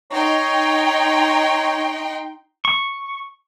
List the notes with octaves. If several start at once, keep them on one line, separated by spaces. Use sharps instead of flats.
D#4 C#5 G5 C6
C#6